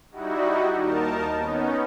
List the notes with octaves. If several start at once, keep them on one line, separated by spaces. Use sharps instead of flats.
G3 D#4 E4 F#4
D#2 D#4 A#4 A5
B3 C#4 D#4